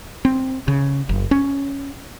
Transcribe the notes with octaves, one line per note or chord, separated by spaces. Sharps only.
C4
C#3
F#1
C#4